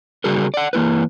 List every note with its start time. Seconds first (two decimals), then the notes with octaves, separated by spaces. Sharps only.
0.24 C#3 G3 F#4 G#4 A#4
0.54 D5 F#5
0.73 E3 A#3 E4 B4